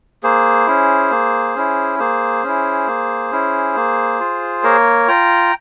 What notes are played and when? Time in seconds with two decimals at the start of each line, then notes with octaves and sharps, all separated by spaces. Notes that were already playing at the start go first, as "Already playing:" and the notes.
0.23 A#3 G#4 C5
0.67 C#4 E4
1.11 A#3
1.56 C#4 E4
1.99 A#3 G#4 C5
2.43 C#4 E4
2.87 A#3
3.32 C#4 E4
3.76 A#3
4.20 F4
4.63 A#3 A#4 C#5
5.08 F4 G5 A#5